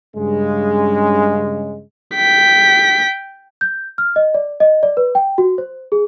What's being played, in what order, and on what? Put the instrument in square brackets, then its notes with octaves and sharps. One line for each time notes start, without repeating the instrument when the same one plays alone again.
[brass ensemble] G2 C#3 G#3
[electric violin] G5 B6
[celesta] G6
F6
D#5
D5
D#5
D5
B4
G5
F#4
C5
G#4